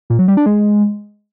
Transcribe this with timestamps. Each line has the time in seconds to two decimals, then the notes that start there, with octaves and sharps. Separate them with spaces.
0.10 A#2
0.19 F#3
0.28 G3
0.37 D4
0.46 G#3